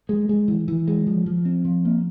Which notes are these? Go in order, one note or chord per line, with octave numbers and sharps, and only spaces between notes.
G#3
G#3
E3
E3
G#3
F3
F3
C4
F3
A#3